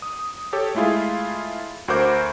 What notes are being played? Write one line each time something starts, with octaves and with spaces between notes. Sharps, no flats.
D#6
G4 A4 C#5
G#3 A3 E4 F4 G#4
D2 F#4 A#4 C5 D6 G6